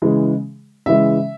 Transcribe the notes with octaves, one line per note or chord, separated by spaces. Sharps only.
C#3 E3 G#3
C#3 E3 G#3 E5